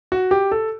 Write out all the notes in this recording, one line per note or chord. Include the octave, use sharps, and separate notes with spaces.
F#4
G4
A4